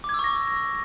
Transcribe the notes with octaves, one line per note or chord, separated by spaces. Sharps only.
D6
G#6
E6
C#6
A#6